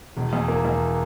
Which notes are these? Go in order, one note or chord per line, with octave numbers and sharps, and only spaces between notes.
E1
E2
A#3
E2